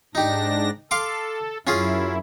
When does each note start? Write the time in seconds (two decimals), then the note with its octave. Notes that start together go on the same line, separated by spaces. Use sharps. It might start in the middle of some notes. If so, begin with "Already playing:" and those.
0.15 G#2 D4 D#4 G4 A#6
0.91 A4 F5 C6 D6
1.67 F#2 C#4 E4 F4 G#4